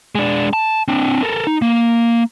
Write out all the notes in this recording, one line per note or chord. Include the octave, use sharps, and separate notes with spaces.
G#3 D4
A5
C4 D4
A4 A#4
D#4
A#3